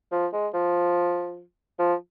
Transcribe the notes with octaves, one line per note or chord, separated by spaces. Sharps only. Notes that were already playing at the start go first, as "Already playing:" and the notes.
F3
G#3
F3
F3